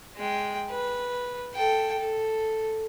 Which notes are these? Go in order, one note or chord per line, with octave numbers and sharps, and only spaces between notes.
G#3 G5
B4
A4 G5
A4